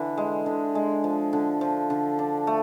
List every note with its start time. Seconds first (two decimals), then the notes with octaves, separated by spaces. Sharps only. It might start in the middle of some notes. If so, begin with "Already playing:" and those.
Already playing: D3 E3
0.17 G#3
0.46 D3
0.75 G#3
1.04 F3
1.33 D3
1.61 F3
1.90 D3
2.19 D4
2.47 A3